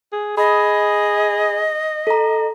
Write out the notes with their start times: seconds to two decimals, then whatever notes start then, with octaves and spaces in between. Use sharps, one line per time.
0.12 G#4
0.37 G#4 D#5 B5
2.07 A4 A#5